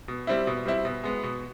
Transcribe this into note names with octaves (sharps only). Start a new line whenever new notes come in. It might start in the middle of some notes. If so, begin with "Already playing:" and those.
B2
G3 C4 E4
B2
G3 C4 E4
B2
G#3 B3
B2